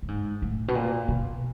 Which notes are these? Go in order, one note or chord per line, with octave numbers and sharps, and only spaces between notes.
A2
G#2
A2
B2
A#2
B2